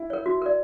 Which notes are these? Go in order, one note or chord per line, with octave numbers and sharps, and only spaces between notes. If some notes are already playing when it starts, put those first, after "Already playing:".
Already playing: E4
A#4 C#5
F#4
A#4 D5